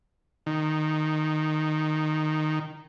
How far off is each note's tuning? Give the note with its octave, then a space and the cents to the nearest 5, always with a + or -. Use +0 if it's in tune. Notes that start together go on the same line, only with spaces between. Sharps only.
D#3 -10